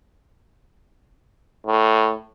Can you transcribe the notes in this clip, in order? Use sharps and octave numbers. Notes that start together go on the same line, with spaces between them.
A2